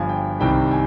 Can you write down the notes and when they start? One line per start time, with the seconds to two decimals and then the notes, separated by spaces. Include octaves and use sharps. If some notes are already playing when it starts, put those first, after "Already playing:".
Already playing: G1 G2 F3 G#5
0.09 G5
0.40 C2 C3 D#3 G3 G5
0.71 G#5